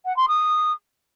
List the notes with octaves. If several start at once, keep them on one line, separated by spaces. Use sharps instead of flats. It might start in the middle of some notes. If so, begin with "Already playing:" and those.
F#5
C6
D#6